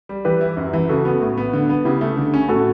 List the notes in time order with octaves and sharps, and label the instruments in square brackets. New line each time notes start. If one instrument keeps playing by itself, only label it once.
[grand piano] G3
[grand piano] E3 [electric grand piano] G4 B4
[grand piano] E4
F#2
E3
[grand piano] C#3 [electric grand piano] F#4 A4
[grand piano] B3
A2
B3
D3
B3
[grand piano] C#3 [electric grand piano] E4 G4
[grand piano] A3
D3
C#4
[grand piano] A2 [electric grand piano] F#4 A4